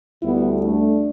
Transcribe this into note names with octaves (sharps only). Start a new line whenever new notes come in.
D2 D3 G3 B3 E4
A3 D4